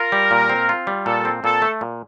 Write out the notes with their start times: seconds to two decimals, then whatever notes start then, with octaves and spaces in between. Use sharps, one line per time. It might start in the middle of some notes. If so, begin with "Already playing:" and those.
Already playing: F4 A#4
0.12 G3
0.31 A#2
0.49 C4
0.69 F4
0.87 G3
1.06 A#2 A4
1.25 C4
1.44 A#2 A4
1.62 A3
1.81 A#2